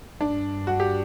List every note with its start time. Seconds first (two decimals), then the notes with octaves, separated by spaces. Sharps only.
0.21 G2 D4
0.67 F#4
0.80 G4